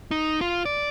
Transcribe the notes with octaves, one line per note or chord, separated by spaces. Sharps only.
D#4
F4
D5